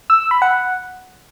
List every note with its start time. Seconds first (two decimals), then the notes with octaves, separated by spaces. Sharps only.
0.10 E6
0.20 E6
0.31 B5
0.42 F#5